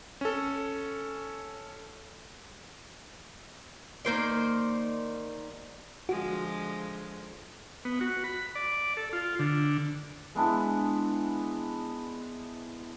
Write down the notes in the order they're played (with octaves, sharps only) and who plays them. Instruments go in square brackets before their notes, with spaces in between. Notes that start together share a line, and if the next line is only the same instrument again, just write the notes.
[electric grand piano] C#4 A4
[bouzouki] D#3 A#3 C5 D5
[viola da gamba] D3 F3 G#3 [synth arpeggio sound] F#4
[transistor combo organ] B3
F#4
B5
D5
A4
F4
D3
[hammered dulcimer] G#3 B3 D4 E4